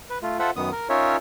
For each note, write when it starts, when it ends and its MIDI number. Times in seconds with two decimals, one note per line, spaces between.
0.10 0.18 71
0.23 0.38 57
0.23 0.38 65
0.39 0.50 65
0.39 0.50 69
0.39 0.50 72
0.39 0.50 76
0.39 0.50 78
0.56 0.71 42
0.56 0.71 51
0.56 0.71 59
0.56 0.71 87
0.72 0.88 70
0.90 1.17 61
0.90 1.17 63
0.90 1.17 65
0.90 1.17 70
0.90 1.17 73
0.90 1.17 76